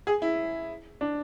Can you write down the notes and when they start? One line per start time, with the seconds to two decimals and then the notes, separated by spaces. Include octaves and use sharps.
0.07 G#4
0.22 E4
1.01 D4